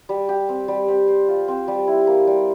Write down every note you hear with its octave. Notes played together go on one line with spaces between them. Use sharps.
G3
G4
C4
G3
C4
C5
F4
C4
G3
E4
A#3
G3